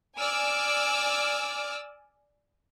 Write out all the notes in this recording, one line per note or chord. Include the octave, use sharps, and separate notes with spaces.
D5 G#5 D6 E6 F6